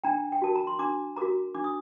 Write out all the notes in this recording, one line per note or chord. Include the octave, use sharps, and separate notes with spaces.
D4 G5 A#5
G5
F#4 A#4 A5
A#5
C6
D4 A#5 D6
F#4 A#4 A#5 D6
D4 D6
D#6